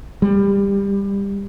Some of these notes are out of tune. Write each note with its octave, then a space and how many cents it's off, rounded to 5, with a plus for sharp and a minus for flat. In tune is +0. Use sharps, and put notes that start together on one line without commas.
G3 +20